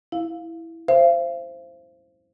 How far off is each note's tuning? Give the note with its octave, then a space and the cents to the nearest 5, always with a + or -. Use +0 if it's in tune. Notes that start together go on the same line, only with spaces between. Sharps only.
E4 +0 F5 +0
C5 +0 F5 -45